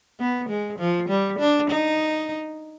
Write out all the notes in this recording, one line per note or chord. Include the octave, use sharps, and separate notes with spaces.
B3
G#3
F3
G3
D4
D#4